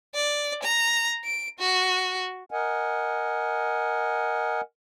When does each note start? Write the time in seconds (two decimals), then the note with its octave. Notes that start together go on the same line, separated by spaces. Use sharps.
0.14 D5
0.63 A#5
1.24 D7
1.59 F#4
2.51 A#4 D#5 F#5 G#5